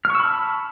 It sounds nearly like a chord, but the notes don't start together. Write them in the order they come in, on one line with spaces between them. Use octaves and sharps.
F6 C#6 E6 B5 A5